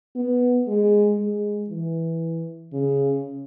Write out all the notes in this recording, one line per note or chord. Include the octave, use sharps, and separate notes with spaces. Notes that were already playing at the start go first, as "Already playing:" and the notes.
B3
G#3
G#3
E3
C#3